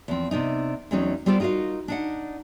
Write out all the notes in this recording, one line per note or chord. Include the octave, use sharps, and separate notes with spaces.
E2 F3 C4
C3 B3 D4 D#4
E2 F#3 A3 C4 C#4 D#4
G3 B3 F4 A4 C5 D5
D#4 F4 F#4 A#4 F5
D4 D#4 F#5